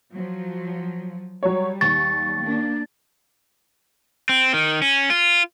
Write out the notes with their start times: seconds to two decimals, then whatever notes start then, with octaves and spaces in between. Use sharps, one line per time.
0.13 F3 F#3
1.43 F#3 G3 C#5
1.81 D#2 C#6 A6
2.39 A#3 D4
4.29 C4
4.54 D#3
4.82 C#4
5.10 F4